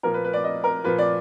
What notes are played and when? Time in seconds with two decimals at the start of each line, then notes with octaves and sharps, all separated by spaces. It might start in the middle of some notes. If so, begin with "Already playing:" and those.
0.03 A#2 F3 A#4
0.14 B4
0.24 B4
0.33 D5
0.44 D#5
0.64 A#4
0.84 A#2 F3 B4
0.98 D5